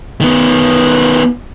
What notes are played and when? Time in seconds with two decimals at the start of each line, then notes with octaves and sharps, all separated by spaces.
0.21 D#3 B3